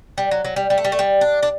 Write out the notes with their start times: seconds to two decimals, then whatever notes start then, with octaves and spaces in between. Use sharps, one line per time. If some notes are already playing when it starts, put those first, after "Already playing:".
0.18 G3
0.31 F#3
0.45 F#3
0.56 G3
0.70 G3
0.78 A3
0.85 G3
0.92 A3
0.99 G3
1.21 D4
1.43 D4